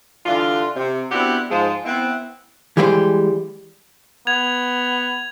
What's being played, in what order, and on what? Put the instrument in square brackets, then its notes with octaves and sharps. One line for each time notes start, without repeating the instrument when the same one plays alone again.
[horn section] D3 E3 G3 D4 F4
C3
B3 C4 D4 E4 F#4 G4
G#2 F3 G#3
B3 C4 E4
[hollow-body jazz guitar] E3 G3 G#3 E4 G4 C5
[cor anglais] B3 [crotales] G#6 F7